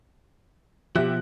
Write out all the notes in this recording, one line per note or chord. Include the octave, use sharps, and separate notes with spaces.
B2 F3 G4 E5 F#6